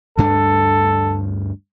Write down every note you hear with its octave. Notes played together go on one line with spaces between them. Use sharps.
D2 G2 D4 A4